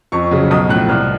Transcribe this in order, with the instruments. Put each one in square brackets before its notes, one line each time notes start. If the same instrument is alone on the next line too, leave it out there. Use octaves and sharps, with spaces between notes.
[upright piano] F2 C#6
C#3 F#3
B1 D#6
A2 F3 F#6
C2 F6